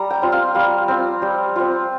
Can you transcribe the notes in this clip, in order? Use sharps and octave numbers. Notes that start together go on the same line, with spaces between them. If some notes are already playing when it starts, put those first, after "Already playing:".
Already playing: G3 A#5
G5
C4 F4
F5
G3 F5
C4 F4
G3
C4 F4